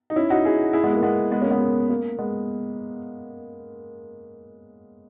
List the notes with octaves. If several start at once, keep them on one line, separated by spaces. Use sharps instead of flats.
D#4
C#4 E4
D#4 F#4
E4 G#4
E4 G#4
G#3 B3
A#3
G#3 B3
G#3 B3
A#3 C#4
G#3 B3
A#3
A#3
G#3 B3